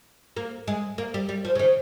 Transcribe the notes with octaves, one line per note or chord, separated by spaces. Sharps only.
A#3
G#3
A#3
G3
G3
F3
C#3
D#3